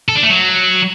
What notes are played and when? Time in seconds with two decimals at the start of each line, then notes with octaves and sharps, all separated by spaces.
0.09 A4
0.16 D4
0.23 A3
0.30 F#3